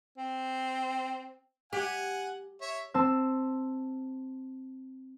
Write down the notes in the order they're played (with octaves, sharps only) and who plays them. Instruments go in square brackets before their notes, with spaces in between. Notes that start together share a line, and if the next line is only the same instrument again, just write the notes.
[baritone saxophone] C4
[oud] G4 [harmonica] F#5 G#5
[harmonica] C#5 E5
[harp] C4 A5 E6